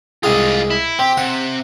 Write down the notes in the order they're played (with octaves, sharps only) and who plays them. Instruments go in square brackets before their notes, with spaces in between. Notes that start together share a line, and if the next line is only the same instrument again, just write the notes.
[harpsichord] C2 G#2 G#4 [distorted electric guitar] F4 D#5
[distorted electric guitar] E4
[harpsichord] C4 [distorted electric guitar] G4
[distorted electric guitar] C3 [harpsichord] F#5